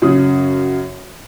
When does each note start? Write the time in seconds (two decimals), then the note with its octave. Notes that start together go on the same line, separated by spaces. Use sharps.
0.02 F#2 C#3 C#4 D#6